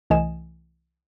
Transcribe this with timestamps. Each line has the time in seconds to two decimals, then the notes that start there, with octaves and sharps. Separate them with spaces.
0.10 C2 E3 A3 D#5 G#5 E7